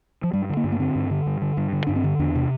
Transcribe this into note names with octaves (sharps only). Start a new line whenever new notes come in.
F3
G2 G3
D3
A#3
G2
A#3
D3 C4
G2
D3
G2
D3
G2
D3
G2 D4
C4
D3
E2 D4
C3